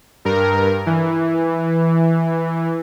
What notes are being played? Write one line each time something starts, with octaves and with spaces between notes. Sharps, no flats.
G2 A#4
E3